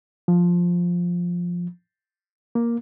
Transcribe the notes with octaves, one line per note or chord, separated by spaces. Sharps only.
F3
A#3